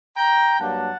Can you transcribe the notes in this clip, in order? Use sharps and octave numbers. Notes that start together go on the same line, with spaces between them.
G5 A#5
G2 F#3 A#3 D4 F#5 A5